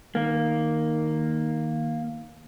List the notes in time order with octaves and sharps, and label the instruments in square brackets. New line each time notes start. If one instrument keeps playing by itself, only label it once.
[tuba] D#3 [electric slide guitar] A#3